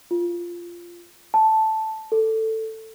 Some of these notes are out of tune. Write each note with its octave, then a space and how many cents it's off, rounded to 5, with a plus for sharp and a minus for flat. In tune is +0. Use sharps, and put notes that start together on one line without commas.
F4 -10
A5 -5
A4 +10